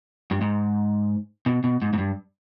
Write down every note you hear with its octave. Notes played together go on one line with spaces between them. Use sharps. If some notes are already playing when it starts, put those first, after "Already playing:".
G2
G#2
B2
B2
G#2
G#2
G2